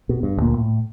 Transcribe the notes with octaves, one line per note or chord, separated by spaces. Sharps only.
B2
G2
D2 A#2 A#3
A2